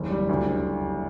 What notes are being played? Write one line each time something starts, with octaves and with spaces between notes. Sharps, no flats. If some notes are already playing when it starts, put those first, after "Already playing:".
Already playing: F#1 D#2
G3
D2